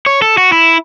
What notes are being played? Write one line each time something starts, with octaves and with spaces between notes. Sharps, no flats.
C#5
A4
F#4
E4